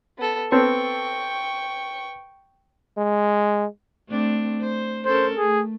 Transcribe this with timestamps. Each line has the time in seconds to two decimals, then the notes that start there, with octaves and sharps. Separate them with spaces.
0.18 B3 A4
0.52 B3 C4 A4 G5 C#6
2.98 G#3
4.08 A3 C4 D4
4.61 C5
5.05 C#4 A4 A#4 C5
5.38 A3 G#4